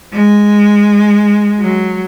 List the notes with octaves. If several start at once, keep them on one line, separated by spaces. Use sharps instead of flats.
G#3
F#3